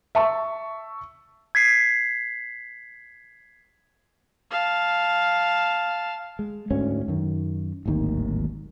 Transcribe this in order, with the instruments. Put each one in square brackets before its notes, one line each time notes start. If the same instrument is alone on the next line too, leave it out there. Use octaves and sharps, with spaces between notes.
[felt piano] E5 A5 C#6
[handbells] G#6 B6 C7
[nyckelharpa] F5 A5
[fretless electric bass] G#3
D2 G#2 C#4
F#2 D#3
D1 G#1 D#2 D#3